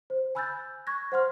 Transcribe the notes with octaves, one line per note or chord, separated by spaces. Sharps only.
C5
G#5 B5 E6 F#6 G6 A6
C#6 F#6 G#6 A#6
C5 F#5 C6 F6